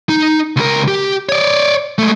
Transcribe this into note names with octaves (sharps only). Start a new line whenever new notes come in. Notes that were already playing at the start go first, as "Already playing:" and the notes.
D#4
C#2 A#4
G4
C#5 D5
G#3 A3